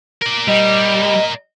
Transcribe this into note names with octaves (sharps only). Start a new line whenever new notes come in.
A#4 D5
G3 D#5